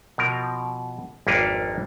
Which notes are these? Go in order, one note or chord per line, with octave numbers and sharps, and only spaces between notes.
B2 F3 A#4
G#1 F2 A#3 D4 B4 C#5